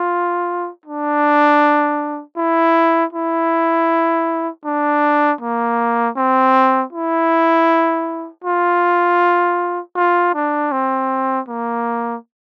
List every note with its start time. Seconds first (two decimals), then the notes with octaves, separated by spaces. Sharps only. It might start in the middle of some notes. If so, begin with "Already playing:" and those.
Already playing: F4
0.86 D4
2.36 E4
3.13 E4
4.65 D4
5.41 A#3
6.16 C4
6.93 E4
8.44 F4
9.96 F4
10.34 D4
10.72 C4
11.48 A#3